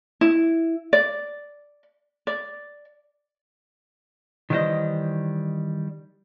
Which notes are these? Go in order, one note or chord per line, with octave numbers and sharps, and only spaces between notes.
E4
D5
D5
D#3 E3 G3 F4 C5 D#5